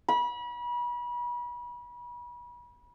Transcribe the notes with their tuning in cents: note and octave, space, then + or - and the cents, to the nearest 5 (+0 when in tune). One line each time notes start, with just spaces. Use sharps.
B5 -35